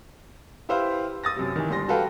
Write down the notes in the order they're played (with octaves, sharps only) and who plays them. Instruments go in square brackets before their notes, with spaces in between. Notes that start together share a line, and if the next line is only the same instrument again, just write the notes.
[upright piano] E4 G4 B4 C5 E5 F5
D#6 A6 A#6
F#2 C3
D#3 E3
G1 G3 C6 A#6
F#4 A4 B4 F5 G5